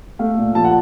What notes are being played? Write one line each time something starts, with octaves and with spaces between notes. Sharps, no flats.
A3 F5
A#2
F3 A5
F#5